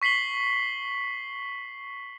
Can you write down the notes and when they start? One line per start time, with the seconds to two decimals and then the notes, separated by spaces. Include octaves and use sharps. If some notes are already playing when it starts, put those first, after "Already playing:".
0.02 C#6 B6 C7 F#7 G7